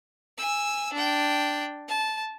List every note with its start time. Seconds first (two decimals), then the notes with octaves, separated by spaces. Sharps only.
0.38 G#5 E6
0.93 D4 G5
1.88 A5